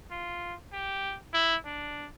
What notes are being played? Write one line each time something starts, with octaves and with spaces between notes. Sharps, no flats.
F4
G4
E4
D4